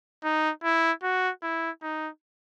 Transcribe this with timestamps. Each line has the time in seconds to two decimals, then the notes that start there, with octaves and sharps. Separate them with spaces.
0.24 D#4
0.64 E4
1.03 F#4
1.43 E4
1.82 D#4